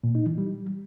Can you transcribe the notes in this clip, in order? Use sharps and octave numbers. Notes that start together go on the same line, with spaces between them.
A#2
D#4
E3
G3